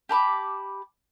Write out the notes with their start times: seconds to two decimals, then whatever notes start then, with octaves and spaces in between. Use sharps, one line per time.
0.09 G4 A5 B5 D6